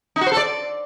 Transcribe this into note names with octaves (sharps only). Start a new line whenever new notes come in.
D#4
F#4
C5
A4
D5